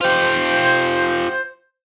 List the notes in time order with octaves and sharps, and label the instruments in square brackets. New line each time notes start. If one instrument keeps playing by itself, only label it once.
[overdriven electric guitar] F4 G4 [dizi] C5